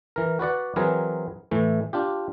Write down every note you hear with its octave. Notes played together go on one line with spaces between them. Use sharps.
E3 A#4
F#4 B4 D5 F#5
E3 F#3 C4 G#4 A#4 B4
A2 E3 A3
D4 F4 G4